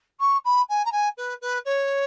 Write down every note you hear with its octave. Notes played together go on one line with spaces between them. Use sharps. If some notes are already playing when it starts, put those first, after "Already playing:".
C#6
B5
G#5
A#5
G#5
B4
B4
C#5